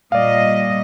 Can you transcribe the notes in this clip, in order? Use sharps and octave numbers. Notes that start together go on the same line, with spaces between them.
A#2 G3 D5 D#5 F5